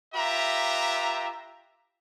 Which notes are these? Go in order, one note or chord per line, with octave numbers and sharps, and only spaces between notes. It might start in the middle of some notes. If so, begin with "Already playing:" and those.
F4 G4 B4 E5 A#5